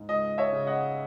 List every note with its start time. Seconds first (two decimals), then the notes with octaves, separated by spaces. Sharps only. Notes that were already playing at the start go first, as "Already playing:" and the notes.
Already playing: G#2
0.09 C#2 D#5
0.38 C#5 E5
0.52 C#3
0.67 D#5 F#5